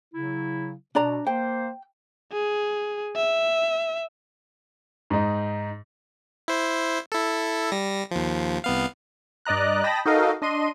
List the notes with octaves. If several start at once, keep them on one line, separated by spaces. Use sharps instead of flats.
C#3 F#3 E4
B2 D4 D5 A#5
A#3 C5 G5
G#4
E5
G#2 D#4
E4 C5
E4 A4
G3 A#6
D#2 F3
C2 B3 F5
G2 D5 D#5 A#5 F#6
D#5 G5 A5 B5 A#6
D#4 F#4 A4 A#4 D#5 F5
D4 D#5 C6 D#7